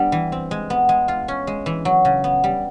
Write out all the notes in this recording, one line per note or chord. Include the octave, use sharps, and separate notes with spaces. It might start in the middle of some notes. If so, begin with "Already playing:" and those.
Already playing: G3 B3 D4
E3
C4
G#3
B3
G#3
F4
C#4
G#3
E3
F#3
C#3
B3
G3